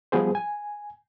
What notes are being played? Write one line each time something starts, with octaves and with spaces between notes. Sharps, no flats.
F3 G3 B3 G#4 C5
G#5